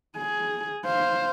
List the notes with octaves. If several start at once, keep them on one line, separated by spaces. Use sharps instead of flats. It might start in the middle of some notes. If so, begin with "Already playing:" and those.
G#4
C5 F5